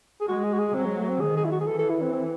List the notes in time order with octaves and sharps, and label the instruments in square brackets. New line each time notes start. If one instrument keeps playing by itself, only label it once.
[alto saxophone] G#4
[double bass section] G#3 [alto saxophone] F#4
[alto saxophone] G#4
F#4
G#4
[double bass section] F#3 [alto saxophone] C4
[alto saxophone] G#3
A3
C4
[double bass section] D#3 [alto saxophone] G#4
[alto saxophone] G#4
E4
F#4
G#4
[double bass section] E3 [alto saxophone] A4
[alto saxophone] A4
E4
C4
C4